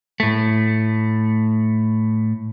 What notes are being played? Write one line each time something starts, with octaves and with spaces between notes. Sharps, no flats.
A2 A3